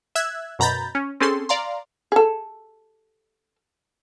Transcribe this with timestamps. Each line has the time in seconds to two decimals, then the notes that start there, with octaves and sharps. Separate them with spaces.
0.15 E5 E6 F#6 G#6
0.59 F#2 B2 A#5 B5 G6 A6
0.95 C#4
1.20 C4 C#4 G#4 A4 C6
1.49 D5 F5 A#5 C6
2.12 G#4 A4